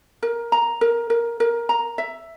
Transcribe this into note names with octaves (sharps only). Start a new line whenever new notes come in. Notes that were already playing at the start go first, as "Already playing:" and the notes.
A#4
A#5
A#4
A#4
A#4
A#5
E5